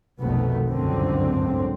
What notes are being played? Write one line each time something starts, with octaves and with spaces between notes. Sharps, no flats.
F1 B1 D#3 A3 B3
G1 C#2 F#2 A2 D3 C4